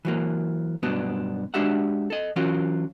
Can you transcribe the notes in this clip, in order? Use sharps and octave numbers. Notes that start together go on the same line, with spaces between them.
E3 F#3 A#3
G2 B2 F#3 B3 D4
G#3 D4 F#4 G4 E5 F#5
A4 D#5
E3 F#3 C#4 F4 F#4 A#4